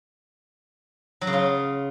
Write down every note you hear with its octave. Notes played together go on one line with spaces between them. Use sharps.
F#3
C#3
F4